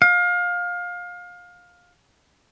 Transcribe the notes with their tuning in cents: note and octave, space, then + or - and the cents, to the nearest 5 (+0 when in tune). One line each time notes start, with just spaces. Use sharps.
F5 +25